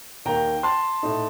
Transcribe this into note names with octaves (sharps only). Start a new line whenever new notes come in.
D#2 D#3 A#3 G5 A#5
A5 C6
A2 A3 D#4